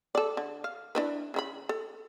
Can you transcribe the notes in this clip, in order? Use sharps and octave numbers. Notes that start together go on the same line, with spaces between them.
A4 D5
D3
F5
D4 E4 B4
C#3 E4 B5
A4